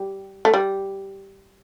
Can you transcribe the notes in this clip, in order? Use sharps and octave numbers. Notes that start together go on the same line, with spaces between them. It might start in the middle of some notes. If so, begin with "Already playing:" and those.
Already playing: G3
A3
G3